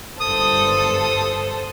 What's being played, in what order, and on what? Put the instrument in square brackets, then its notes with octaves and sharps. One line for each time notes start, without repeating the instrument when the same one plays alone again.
[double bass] G1 G2 [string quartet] A4 C5 [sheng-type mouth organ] D#6